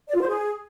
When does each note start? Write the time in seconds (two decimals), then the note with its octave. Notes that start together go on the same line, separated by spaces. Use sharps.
0.08 D5
0.15 F4
0.21 C5
0.28 G#4